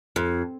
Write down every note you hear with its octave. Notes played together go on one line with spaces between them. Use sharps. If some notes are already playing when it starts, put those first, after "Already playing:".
F2